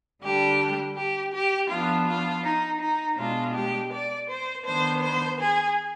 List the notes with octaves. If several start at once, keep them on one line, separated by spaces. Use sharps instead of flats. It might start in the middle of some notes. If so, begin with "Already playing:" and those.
D3 G3 D4 G4
G4
G4
F3 B3 D4 F4
F4
D#4
D#4
B2 G#3 D4 F4
G4
D5
C5
D#3 B3 D4 C5
C5
G#4